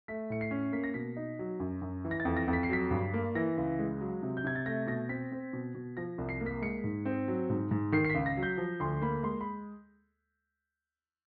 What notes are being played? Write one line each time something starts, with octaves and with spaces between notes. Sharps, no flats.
A3 B6
A2 C#7
C7
C#4
A#3 B6
A#6
B2 B6
D#4
F#3
F#2
F#2
E3
A#6
A6
F2
A#6
F2
B6
C7
F#3 B6
G2
A#3
E3 A#6
C#2
G#3
F#3
C3
G6
C3 G#6
A6
A3 A#6
B2 A#6
C4 B6
C4
B2
B2
F3 A#6
C2
C7
A#3
B6
G#3 C#7
G#2
C4
F#3
G#2
G#2
D#3 C7
C7
C#2 B6
A#6
F#3
G6
F3
D2 C6
A#3 B5
G#3 C6
B5